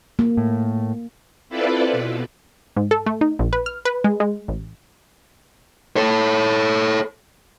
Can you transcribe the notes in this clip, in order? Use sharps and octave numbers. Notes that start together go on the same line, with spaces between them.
A#3
A2
C4 E4 F4 A4 B4 D5
B2
G#2
A4
A3
D#4
A#1
B4
F6
B4
G#3
G#3
A1
A4 C#5